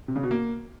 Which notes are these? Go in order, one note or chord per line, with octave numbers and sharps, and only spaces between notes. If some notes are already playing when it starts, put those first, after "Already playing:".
C3
C#3
B2
A#3